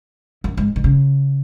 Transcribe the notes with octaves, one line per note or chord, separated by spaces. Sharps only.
F#2
G#2
D#3
C#3